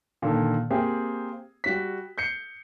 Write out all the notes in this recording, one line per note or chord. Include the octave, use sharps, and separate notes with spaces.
A#2 D3 D#3 A4
A#3 C4 G4 G#4
G3 F#4 B6
G6 C7 C#7